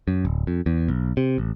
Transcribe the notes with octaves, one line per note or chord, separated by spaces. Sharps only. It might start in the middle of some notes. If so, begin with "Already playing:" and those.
F#2
D1
F2
E2
B1
C3
A1